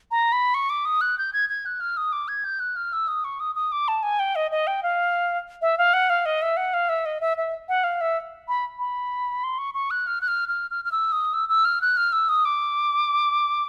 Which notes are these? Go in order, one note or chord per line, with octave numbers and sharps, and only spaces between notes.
A#5
B5
C#6
D6
D#6
F#6
G6
G#6
G#6
F#6
F6
D#6
D6
G#6
G6
F#6
F6
E6
D#6
C#6
D#6
D#6
D6
A5
G#5
G5
D#5
D#5
G5
F5
E5
F5
F#5
F5
D#5
E5
F#5
F5
E5
D#5
E5
E5
F#5
F5
E5
B5
B5
C6
C#6
C#6
F#6
F6
F#6
F6
F6
F6
F6
E6
D#6
E6
E6
F6
F#6
F6
E6
D#6
D6